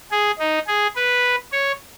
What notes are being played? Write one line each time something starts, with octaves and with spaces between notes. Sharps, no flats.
G#4
D#4
G#4
B4
C#5